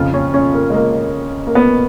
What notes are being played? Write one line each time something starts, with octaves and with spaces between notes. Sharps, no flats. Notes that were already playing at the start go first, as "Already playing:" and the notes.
Already playing: F2 C#3 F3 F4
C#4
C#4
A#3
G#3
A#3
A#3
B3